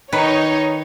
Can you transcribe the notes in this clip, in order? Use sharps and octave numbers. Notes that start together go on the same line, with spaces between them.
D#3 D#4 B4 C#5